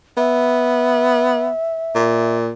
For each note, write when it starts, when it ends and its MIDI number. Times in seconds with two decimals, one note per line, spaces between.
0.17 1.49 59
0.17 2.37 76
1.95 2.50 46